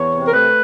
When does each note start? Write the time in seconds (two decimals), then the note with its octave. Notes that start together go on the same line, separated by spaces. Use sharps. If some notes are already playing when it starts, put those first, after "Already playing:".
Already playing: E2 C#5
0.12 C3
0.27 A#4
0.34 A3 B4